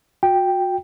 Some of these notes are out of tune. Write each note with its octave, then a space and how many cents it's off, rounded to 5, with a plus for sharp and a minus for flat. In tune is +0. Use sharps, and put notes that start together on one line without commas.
F#4 -30 G5 +0